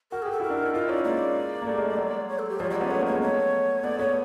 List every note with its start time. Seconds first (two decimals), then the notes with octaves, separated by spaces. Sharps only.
0.12 F#4 A#4
0.22 G4 G#4
0.32 A4
0.39 E4 F#4 A#4
0.50 D4
0.59 D#4
0.66 E4
0.73 D#4 F4 A#4
0.84 E4
0.89 C#4 D#4 D5
1.04 G#3 A#3 D5
1.62 A#3
1.67 G3 A3
1.77 G#3 A#3
1.87 G3 A3
1.98 F#3 G#3
2.29 C#5
2.39 A4
2.49 G4
2.60 F3 G3 C#5
2.70 F#3 G#3 C#5
2.75 D5
2.80 B3 C#4
2.91 A3 B3 C#5
3.01 G#3 A#3
3.06 C#5
3.12 G#3 A#3
3.22 A3 B3 C#5
3.84 A3 B3 D5
3.99 A3 B3 C#5